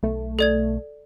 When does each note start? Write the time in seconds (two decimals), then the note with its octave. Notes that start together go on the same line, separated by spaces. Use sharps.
0.03 B1 A3
0.39 A4 D5 G#6